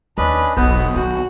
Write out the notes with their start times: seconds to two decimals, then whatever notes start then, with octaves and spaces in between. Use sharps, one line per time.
0.18 D#2 C#4 D4 B4 D#5
0.57 E1 B1 B3 B4 C5 D#5
0.96 D#3 F#4